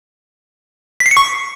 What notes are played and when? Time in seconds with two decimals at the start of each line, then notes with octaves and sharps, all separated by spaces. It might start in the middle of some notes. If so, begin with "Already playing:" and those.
1.00 B6
1.06 C7
1.11 C#7
1.17 C#6